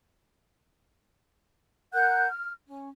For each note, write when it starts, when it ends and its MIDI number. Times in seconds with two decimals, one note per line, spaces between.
1.93 2.27 70
1.93 2.27 78
1.93 2.27 90
1.93 2.27 91
2.30 2.52 89
2.67 2.88 61